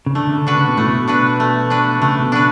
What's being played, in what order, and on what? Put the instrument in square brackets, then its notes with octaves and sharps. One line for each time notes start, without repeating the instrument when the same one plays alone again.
[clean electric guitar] C#3
[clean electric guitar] D3 [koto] A3
[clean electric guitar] C#3
[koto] D4 F#4 B4
[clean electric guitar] C#3
B2
[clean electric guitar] A2 [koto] A3
[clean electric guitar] B2
[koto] D4 F#4 B4
A3
D4 F#4 B4
[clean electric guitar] C#3 [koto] A3
[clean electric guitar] B2
[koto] D4 F#4 B4